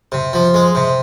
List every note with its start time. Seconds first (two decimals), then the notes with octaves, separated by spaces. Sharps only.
0.12 C3
0.33 F3
0.54 G#3
0.75 C3